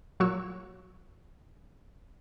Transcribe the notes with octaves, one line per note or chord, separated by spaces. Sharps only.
A#2 F#3 F#4 C#5 C#6 E6